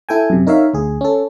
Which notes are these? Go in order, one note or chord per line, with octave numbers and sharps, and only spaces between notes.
E4 A4 G5 G#5
F#2 C3
D#4 A#4 C#5 E5 F5
D2 G#4
C#4 A4